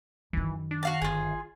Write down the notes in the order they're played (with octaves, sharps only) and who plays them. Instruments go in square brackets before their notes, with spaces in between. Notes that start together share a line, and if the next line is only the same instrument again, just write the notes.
[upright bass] F#2 D#3 [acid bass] E3
[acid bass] D4
[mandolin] F#4 F5 A5
[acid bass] G1 [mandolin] F4 G#4